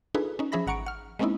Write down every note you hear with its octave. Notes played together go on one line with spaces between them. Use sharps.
D4 D#4 F4 G#4 A4 B4
C#4 D#4
F3 C#4 G#4 E5 B5 A#6
G#1 F#5 A#5 C#6 C#7 D7
F#5 F6
G#3 A#3 C4 C#4 D#4 E4